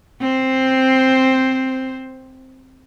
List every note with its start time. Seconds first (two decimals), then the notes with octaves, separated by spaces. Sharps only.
0.21 C4 C5